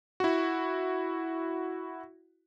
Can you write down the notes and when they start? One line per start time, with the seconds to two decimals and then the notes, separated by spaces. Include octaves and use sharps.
0.20 E4 F#4